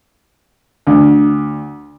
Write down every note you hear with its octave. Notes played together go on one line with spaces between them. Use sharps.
D2